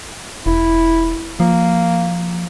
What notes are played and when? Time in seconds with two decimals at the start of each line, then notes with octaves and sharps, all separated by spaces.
0.46 E1 E4
1.40 F3 A#3